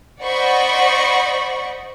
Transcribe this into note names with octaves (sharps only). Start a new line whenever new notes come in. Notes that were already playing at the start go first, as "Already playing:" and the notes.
C5 D5 D#5 F#5 B5 C#6